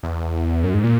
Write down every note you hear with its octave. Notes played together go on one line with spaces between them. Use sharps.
E2
F#2
G#2
A#2